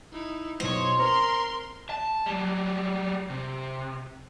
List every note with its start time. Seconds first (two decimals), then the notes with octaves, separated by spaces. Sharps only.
0.12 D#4 E4
0.60 B1 F3 C5 C#5 D#5
0.99 C4 A#4 A#5 C6
1.90 A5
2.26 F#3 G3
3.30 C3